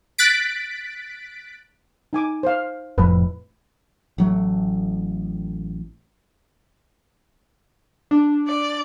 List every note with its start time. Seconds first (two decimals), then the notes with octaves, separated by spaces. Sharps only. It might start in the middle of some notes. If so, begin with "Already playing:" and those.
0.18 F#6 A6 B6 D7
2.13 D#4 G#5 D6
2.43 C5 F5
2.98 F1 F2 A2 B4
4.18 A1 F#3 A3
8.11 D4
8.48 D5